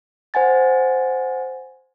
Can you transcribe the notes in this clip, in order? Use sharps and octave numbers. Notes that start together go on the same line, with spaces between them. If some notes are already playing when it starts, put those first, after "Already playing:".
C5 F#5 G#5 A6